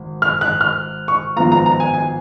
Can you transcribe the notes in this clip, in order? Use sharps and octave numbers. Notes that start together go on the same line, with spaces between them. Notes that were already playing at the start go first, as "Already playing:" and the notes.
Already playing: G#1
F6
F#6
F6
C#6
G#1 G#2 F3 B3 F4 A#5
A#5
A#5
G#5
G#5